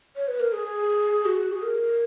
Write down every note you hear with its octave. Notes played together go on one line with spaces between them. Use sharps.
C#5
B4
A#4
G#4
F#4
G#4
A#4